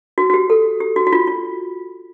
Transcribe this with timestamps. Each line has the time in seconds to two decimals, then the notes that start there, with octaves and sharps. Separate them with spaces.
0.18 F#4
0.30 F#4
0.34 G4
0.50 A4
0.80 G4
0.96 F#4
1.07 F#4
1.12 F4
1.27 F4